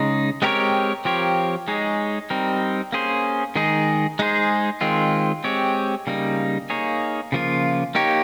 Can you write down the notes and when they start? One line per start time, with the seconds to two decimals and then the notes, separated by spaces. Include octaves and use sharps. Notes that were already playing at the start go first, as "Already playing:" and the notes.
Already playing: C#3 G#3 D#4
0.42 G#3 C4 G4 A#4 C#5
1.05 F3 C4 G4 A#4 C#5
1.68 G#3 D#4 G#4 C#5
2.30 G3 C4 D#4 A#4
2.93 A#3 C#4 G#4 C5
3.56 D#3 G#3 D#4 G#4
4.19 G#3 D#4 G#4 C5
4.81 D#3 G#3 C4 F4
5.44 G#3 C4 G4 C#5
6.07 C#3 G3 A#3 D#4
6.70 A#3 D#4 G#4 C#5
7.32 C#3 F3 A#3 F4
7.95 A#3 D#4 G4 C#5